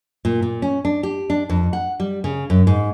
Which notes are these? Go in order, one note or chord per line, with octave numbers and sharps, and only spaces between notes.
A#2
A#2
C#4
D4
G4
D4
F2
F#5
G3
C#3
F#2
G#2